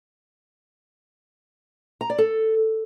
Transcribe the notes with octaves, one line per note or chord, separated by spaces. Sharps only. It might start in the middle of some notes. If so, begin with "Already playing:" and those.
A#5
D5
A4